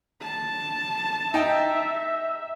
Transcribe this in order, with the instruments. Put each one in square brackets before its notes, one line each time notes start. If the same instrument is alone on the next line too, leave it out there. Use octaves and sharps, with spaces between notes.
[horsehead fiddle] A5
[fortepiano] D#4 G5 [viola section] E5